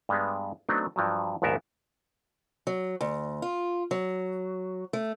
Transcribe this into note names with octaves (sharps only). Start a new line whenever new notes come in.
G2 G3 G#3 B3
F#3 A3 B3 C4 D4 D#4
G2 F3 F#3
A#1 D#2 G#2 B3 A#4 E5
F#3
D2
F4
F#3
A3